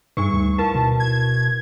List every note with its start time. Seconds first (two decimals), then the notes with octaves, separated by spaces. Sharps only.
0.17 G2 G3 D#4 B4 C#6
0.33 D2
0.58 E4 A#4 B4 A5
0.75 B2
1.00 G#6